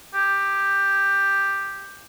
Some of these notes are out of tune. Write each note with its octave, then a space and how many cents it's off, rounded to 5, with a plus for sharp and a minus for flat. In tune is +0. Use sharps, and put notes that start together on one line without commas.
G4 +10